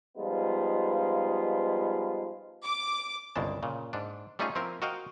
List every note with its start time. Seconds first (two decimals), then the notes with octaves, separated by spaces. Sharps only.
0.17 F3 G3 G#3 B3 D#4 F4
2.65 D6
3.36 G1 C2 C#3 G#3 A5
3.63 A#2 C#3
3.93 G#2 D4
4.39 G3 A3 C#4 D#4 F4 G#4
4.55 F3 C4 E4 A#4
4.82 F#4 A#4 D#5 F5 G5